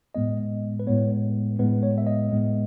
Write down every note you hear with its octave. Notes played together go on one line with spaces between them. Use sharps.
A2 G#3 B3 D#5
B4
A2 G#3 B3 C#5
A2 G#3 B3 B4
C#5
E5
D#5
A2 G#3 B3